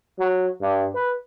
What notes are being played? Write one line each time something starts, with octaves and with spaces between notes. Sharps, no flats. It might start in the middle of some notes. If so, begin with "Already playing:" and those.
F#3
G2
B4